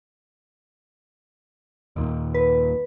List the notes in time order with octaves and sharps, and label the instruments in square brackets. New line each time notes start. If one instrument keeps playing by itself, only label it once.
[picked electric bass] D#2 A#2
[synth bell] B4